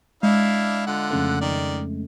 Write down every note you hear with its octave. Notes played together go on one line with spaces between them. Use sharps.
G#3 D4 E4 D#5 F5
D3 F4 F#5
F2 C#3 A3
D#3 D5